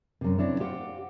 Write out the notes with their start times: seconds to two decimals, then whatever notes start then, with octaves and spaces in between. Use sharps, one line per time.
0.21 F#2 C3
0.38 C4 D4 E4 C#5
0.60 G4 C5 F5 F#5